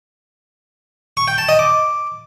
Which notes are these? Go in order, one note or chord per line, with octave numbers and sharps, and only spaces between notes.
C#6
G5
A5
D#5
D6